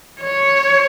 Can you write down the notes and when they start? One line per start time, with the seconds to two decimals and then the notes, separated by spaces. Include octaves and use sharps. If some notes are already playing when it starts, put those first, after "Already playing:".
0.20 C#5